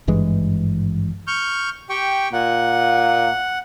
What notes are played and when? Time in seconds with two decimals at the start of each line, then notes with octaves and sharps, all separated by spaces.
0.07 G#1 G2 E3 G#3
1.27 C#6 F6 G6
1.90 G4 G5 C#6
2.33 A#2 F#5